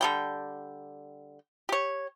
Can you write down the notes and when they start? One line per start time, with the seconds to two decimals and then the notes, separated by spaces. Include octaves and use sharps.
0.01 D3 G3 G5
1.69 G4 C#5